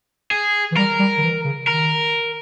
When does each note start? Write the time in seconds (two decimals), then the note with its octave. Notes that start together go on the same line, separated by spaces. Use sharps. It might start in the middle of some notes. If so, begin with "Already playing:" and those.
0.31 G#4
0.72 E3
0.77 G3 A#4
0.99 G3
1.18 D#3
1.23 E3
1.45 C#3
1.67 D#3 A#4